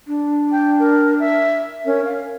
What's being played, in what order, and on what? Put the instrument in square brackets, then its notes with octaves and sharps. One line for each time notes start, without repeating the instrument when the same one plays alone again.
[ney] D4
[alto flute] G5
A#4
E5
[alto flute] C#4 [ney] A#4
[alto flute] F5